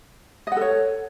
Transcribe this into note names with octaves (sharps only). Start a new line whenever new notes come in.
A4 C#5 D#5 F#5